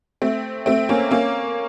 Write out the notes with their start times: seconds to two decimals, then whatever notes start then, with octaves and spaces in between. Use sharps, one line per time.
0.22 A3 C4
0.66 A3 C4
0.89 A#3 C#4
1.11 A#3 C#4